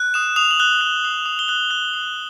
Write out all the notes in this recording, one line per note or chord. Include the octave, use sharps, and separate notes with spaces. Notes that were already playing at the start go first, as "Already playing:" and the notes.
Already playing: F#6
D#6 E7
D#6 F7
F#7
F#6 G7
F#6
D#6
D#6
G7
F#6 F#7
F#6
D#6